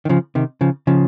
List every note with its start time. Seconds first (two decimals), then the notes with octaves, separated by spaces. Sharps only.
0.05 D#3
0.09 C#3 F3
0.35 C3 D#3
0.61 C#3 F3
0.87 C#3 F3